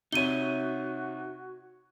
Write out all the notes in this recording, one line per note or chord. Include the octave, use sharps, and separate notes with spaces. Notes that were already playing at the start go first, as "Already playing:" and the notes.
C3 D#4 F#4 C#5 E5 D#7 G7